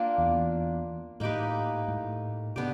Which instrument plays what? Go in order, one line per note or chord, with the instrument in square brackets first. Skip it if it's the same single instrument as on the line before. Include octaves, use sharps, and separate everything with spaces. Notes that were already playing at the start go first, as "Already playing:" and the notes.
Already playing: [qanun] A#3 D4 F4
[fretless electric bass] E2
[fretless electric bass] A2 [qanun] A#3 D#4 G4 B4
[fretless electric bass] A2
[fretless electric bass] C3 [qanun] B3 D4 G4